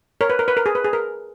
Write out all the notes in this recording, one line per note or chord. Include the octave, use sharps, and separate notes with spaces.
A#4 C#5
B4
A#4
B4
A#4
G#4
B4
G#4
A#4